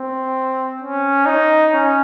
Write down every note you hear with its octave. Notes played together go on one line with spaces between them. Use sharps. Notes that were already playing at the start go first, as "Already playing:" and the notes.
Already playing: C4
C#4
D#4
C#4